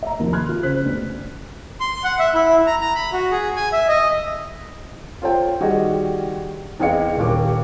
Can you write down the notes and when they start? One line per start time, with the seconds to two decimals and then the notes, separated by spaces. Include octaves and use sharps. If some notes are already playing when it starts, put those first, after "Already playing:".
0.03 E5 A#5
0.19 D#2 C3 D#3 F3
0.33 B5 C6 F6 F#6 G#6
0.49 F4
0.63 C#3 C5 F#6 B6
0.84 D2 B2 D3
1.80 C6
2.04 F#5
2.19 E5
2.34 E4
2.67 A#5
2.81 A#5
2.95 B5
3.13 F#4
3.31 G#4
3.56 G#5
3.73 E5
3.88 D#5
5.22 F4 A4 C5 C#5 G5
5.60 D#3 G3 F#4 G#4 D#5
6.80 E2 C4 G#4 D#5 F5 C#7
7.17 D#1 D#2 D6